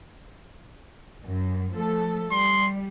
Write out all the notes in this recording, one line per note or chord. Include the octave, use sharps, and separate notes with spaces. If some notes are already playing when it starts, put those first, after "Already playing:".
F#2
F3 A3 A4
G3 C6